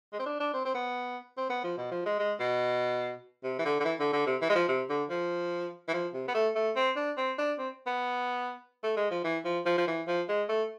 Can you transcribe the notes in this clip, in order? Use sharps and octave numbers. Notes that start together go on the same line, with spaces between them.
G#3
C4
D4
D4
C4
C4
B3
C4
B3
F3
B2
F3
G#3
G#3
B2
C3
E3
D3
D3
E3
D3
D3
C3
E3
G#3
F3
C3
D3
F3
E3
F3
C3
B3
A3
A3
C4
D4
C4
D4
C4
B3
A3
G#3
F3
E3
F3
F3
F3
E3
F3
G#3
A3